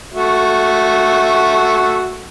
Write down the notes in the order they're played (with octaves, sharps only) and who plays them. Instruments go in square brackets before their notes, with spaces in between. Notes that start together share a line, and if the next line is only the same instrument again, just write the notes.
[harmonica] A3 F#4 E5